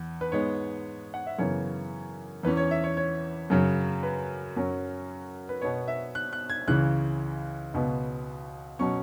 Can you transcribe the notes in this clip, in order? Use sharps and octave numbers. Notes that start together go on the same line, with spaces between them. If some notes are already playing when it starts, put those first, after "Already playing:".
Already playing: E2
B4
G#2 G#3 B3 C#5
F#5
E5
F#2 C#3 E3 B3 C#5
E2 E3 C#4 B4
C#5
E5
C#5
C#5
F#2 C#3 F#3
B4
F#2 F#3 C#4
B4
B2 B3 C#5
E5
F#6
F#6
G#6
C#2 C#3 E3 F#6
C#2 B2 B3
B2 F#3 C#4 C#6